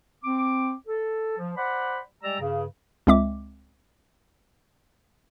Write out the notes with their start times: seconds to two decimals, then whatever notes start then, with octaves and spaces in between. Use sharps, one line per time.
0.24 C4 D6
0.88 A4
1.38 F3
1.57 C5 D5 F#5 B5
2.22 G3 G#3 G4 D5 A#5 E6
2.40 G2 C#3
3.07 C#2 G#3 C4 E5 D6